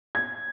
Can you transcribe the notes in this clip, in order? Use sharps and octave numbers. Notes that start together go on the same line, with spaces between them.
G#6